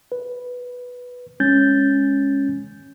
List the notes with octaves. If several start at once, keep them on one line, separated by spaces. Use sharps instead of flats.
B4
G#3 C#4 G6 A6